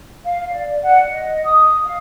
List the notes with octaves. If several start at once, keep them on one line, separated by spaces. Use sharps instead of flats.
F5
D5
F#5
D#5
D#6
F5